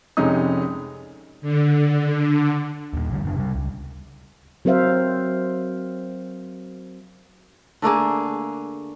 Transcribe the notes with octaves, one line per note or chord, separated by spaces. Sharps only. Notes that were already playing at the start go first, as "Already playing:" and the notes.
F1 C3 G#3 C#4 D#4 D#6
D3
D#2 A#2
C2 D3 G3
F#1 D4
C3 G3
C#2
F#3 C4 A#4 C5 E5 F5
D3 A3 A#3 G#4